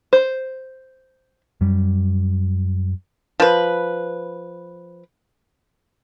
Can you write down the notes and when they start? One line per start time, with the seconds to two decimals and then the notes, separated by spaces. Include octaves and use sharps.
0.13 C5
1.61 F#2 G3
3.40 F3 B4